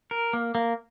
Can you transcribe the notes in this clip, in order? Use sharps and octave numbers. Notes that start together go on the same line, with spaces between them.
A#4
A#3
A#3